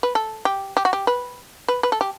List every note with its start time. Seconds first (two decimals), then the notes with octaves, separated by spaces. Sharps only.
0.03 B4
0.15 A4
0.45 G4
0.77 G4
0.85 F#4
0.93 G4
1.07 B4
1.68 B4
1.83 B4
1.92 A4
2.01 G4